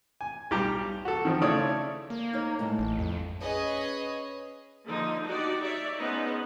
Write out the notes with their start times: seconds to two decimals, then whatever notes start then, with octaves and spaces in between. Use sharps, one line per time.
0.21 G#5
0.51 B1 G3 G4 A#5
1.05 F#4 A4
1.25 D#3 F3 C4
1.41 C#3 A3 E4 C#5 D5 D#6
2.10 A#3
2.33 D#4 C#5
2.59 A2 G#3 A5
2.79 A1
2.99 F2
3.40 C#4 G#4 B4 C#5 D#5
4.85 D3 F3 A#3 D#4
5.24 D#4 F#4 G4 D5
5.63 C#5 D5 E5
5.99 B3 C#4 D#4 G#4 B4 C5